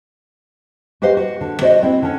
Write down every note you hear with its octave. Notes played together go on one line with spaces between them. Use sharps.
F#4 G4 B4 C5 D#5 F5
F#4
D3
F#4 C5 D5 D#5
C4 E4
D3 C#4